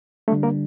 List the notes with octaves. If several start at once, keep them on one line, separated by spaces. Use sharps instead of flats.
D3 G3 A3 D4 A4
A#3 A#4